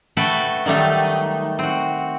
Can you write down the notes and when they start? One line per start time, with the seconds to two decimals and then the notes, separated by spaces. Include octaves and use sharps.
0.17 A3 F#4 A4 B4 G5
0.66 D#3 F#3 G3 A3 D#4
1.59 C4 F#4